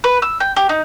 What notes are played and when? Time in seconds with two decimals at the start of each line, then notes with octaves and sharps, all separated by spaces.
0.04 B4
0.22 E6
0.40 G5
0.56 G4
0.69 D#4